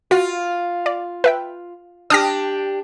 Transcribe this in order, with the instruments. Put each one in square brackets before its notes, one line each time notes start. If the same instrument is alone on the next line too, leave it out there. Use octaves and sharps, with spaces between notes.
[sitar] F4 [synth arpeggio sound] F#4
[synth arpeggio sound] D5
B4 E5 G5
[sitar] D4 G4 [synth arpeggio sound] D#6 F6 A#6